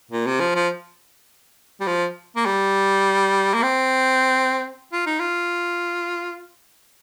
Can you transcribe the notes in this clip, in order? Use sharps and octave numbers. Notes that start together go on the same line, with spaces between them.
A#2
C3
F3
F3
G3
F3
A#3
G3
A#3
C4
F4
D#4
F4